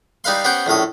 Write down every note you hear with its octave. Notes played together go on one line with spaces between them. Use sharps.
G3 D#4 B4 F5 C6
B3 C#4 G4 C5 F#5 G5
A#1 A2 C#4 D#6